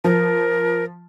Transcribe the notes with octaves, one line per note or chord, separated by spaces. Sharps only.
F3 A#4